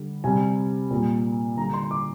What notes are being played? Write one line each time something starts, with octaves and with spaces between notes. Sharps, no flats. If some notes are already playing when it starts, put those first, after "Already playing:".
Already playing: D3 G3
C3 G3 G#5
A#2 G3
D3 G3 A#5
C6
D6